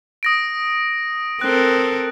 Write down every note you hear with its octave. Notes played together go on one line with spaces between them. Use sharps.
D#6 A#6 D7
C4 A4 A#4 F#6